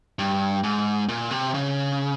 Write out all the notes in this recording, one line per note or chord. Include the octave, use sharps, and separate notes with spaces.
G2
G#2
A#2
C3
C#3